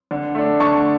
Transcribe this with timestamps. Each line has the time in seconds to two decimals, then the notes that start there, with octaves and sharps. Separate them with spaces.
0.11 D3
0.35 A3 D4
0.60 D3 A5 C#6